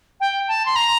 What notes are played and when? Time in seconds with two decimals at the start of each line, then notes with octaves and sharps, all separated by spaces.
0.20 G5
0.48 A5
0.65 C6
0.76 A#5